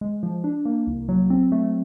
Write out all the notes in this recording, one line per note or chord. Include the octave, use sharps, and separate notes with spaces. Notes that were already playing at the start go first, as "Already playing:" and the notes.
G#3
F3
D4
A#3
C2
F#3
C4
A3